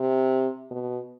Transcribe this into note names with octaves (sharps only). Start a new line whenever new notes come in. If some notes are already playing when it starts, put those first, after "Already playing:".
Already playing: C3
B2